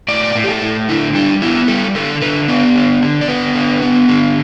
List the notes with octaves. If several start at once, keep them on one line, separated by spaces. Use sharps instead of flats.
A2 D5
A2
G4
A4
A2
D3 E4
G3 D4
B3 E4
G3 A4
D3 A4
D3 B4
B3 D5
D3
D3
D5
B3 B4
D3
B3
D3